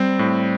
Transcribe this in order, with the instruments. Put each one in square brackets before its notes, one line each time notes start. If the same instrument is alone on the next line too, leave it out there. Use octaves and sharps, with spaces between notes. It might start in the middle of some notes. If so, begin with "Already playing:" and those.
Already playing: [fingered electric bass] G3 [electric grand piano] C4
[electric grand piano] A2